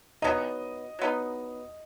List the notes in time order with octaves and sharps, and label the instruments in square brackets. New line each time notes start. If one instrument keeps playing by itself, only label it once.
[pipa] F#3 B3 D#4 [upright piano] D#5
[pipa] F#3 B3 D#4